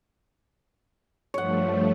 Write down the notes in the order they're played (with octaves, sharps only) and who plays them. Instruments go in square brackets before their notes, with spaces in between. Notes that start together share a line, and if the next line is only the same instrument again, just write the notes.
[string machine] G2 F3 A3 [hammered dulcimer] C#5 F#5